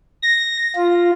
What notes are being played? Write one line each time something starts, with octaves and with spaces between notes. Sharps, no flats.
A#6
F4